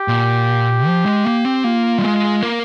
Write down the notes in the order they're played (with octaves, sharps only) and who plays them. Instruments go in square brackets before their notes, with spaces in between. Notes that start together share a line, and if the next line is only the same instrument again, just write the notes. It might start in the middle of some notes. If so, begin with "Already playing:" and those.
Already playing: [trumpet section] G4
[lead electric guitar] A#2
F3
G#3
A#3
C4
[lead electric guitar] A#3 [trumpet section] F4
[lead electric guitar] G3
G#3
A#3